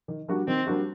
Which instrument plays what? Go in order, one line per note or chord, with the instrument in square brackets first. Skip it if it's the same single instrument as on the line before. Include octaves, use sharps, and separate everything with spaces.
[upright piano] D#3
G3 A#3 D4 F#4
[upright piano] D#3 [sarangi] C4
[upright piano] G3 A#3 D4 F#4